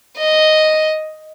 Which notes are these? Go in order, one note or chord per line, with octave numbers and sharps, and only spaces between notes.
D#5